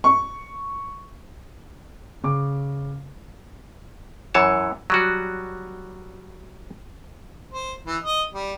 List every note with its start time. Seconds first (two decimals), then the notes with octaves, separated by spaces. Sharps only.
0.04 C#6
2.24 C#3 D6
4.34 F#2 E3 C#5 A5
4.90 F#3 G3 F#4
7.51 C5
7.86 E3
8.03 D#5
8.34 G3